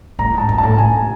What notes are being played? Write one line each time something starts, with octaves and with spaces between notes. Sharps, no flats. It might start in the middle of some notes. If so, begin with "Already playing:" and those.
A2 A#5
G#2 A5
F#2
A5
A2
A2 G#5